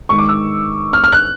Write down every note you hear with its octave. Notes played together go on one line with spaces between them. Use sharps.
G#2 D#3 G#3 C#6
D6
E6
F6
F6
F#6